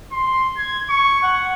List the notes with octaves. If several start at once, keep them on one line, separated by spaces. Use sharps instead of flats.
C6
G#6
C#6
F#5